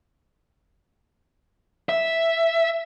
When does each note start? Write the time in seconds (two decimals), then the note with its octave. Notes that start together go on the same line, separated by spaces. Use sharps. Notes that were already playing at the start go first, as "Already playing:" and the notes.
1.89 E5